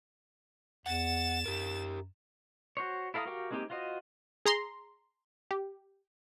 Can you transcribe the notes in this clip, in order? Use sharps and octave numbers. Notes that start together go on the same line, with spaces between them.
E2 F#5 A6 E7
F#2 G4 A#4
F#4 C5 C#5
E4 A4 F5 A#5 D#6
F#4 G4 A#4 F5 G5
G#3 A#3 C4 D#4 G4
F4 F#4 C5 D#5
G#4 A#5 C6
G4